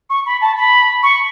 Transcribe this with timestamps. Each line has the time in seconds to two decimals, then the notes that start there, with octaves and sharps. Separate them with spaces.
0.10 C#6
0.26 B5
0.41 A5
0.57 B5
1.03 C#6